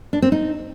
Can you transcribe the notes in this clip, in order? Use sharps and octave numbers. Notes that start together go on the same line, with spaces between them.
D4
C4
D#4